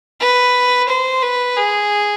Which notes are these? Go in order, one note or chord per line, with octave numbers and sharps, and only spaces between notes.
B4
C5
B4
G#4